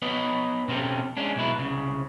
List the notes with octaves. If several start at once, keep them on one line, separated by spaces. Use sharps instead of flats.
B3 B4 C#5 D#5
B2 C4 C#4 G4 A4
G#3 C#4 D4
B1 B2 G#3 E4 B4
C2 C#3